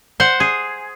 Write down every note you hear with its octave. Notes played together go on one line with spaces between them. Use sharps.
C5 F#5
G#4